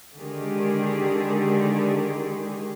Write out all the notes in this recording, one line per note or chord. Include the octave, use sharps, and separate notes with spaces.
D3 D#3 G#3 G4 G#4